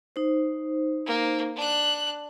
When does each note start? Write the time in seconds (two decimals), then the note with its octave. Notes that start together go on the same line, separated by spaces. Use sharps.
0.16 D#4 C5
1.06 A#3
1.56 D4 F#6